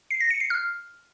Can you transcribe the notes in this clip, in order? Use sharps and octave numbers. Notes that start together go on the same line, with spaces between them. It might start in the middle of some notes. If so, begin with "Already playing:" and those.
C7
A#6
C#7
C7
F6